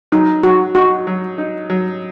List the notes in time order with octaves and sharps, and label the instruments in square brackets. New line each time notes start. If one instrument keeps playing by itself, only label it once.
[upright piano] F#3 [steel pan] D#4
[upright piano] F#3 [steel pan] F#4
[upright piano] D#4 [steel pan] F#4
[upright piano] F#3
D#4
F#3